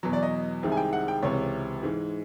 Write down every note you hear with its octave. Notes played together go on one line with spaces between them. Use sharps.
E2 B2 F#3
D5
D#5
C2 C3 D#3 G#3
G#5
G5
F#5
G5
C#2 C3 E3 C#5
G#2 E3 G#3